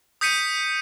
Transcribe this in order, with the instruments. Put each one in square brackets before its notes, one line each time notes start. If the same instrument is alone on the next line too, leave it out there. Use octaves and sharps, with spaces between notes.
[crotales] D#6 G6 B6 C#7 D#7